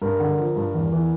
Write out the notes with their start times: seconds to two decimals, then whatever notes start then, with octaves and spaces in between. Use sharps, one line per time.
0.02 G2 A#4
0.20 D3
0.39 F3
0.56 G2
0.74 E2
0.92 E3